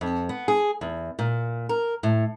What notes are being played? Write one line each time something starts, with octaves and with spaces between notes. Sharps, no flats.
F2
B3
G#4
E2
A#2
A#4
A2